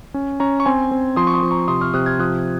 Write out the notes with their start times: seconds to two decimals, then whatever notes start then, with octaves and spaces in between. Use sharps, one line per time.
0.14 C#4
0.40 C#4 A#5 C#6
0.60 C#6
0.66 C4 G#5 C6
0.91 C4
1.16 F3 C6 D#6
1.27 C#6
1.34 C6 D#6
1.43 F3
1.51 A#5 C#6
1.68 C3 C6 D#6
1.81 C#6 F6
1.94 C3 D#6 F#6
2.06 F6 G#6
2.19 F3 D#6 F#6